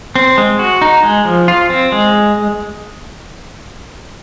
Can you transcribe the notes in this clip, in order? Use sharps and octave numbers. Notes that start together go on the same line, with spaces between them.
C4
G#3
F#4
D#4
G#3
F3
F4
C4
G#3